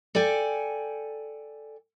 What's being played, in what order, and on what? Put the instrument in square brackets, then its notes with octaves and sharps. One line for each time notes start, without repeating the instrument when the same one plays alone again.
[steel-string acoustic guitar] A4 D5 G5 G#5